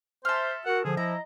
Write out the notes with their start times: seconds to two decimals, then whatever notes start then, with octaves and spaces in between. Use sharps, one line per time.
0.25 A4 C5 E5 C6 F6
0.66 F#4 A#4 F#5
0.85 D3 F3 G#4
0.97 E4 D#5 A#5